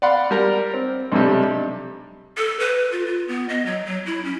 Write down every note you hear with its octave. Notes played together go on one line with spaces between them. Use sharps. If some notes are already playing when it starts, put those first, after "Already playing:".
D5 F5 F#5 B5 C6
G3 A#4
C4
B1 G2 C3 G3
A4
B4
F4
F4
B3
D#5
F#3
F#3
E4
C#4